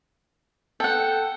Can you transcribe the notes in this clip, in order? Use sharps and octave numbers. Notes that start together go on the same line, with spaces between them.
A4 F#5 G5